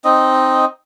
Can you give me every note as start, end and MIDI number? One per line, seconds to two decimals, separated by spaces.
0.05 0.65 60
0.05 0.65 63
0.05 0.65 75